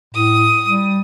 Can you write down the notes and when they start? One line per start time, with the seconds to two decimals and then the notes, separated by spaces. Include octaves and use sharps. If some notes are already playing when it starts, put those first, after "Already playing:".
0.14 A2 D#6
0.66 G3